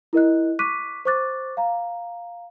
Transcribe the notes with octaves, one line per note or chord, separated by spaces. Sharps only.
E4 A#4 D#5 F#6
C#6 D6 F#6 B6 D#7
C5 C#6 D6 F#6 A6
F5 A#5